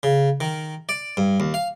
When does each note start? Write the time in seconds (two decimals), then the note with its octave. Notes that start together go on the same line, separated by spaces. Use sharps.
0.03 C#3
0.41 D#3
0.89 D5
1.17 G2
1.40 D#2
1.54 F5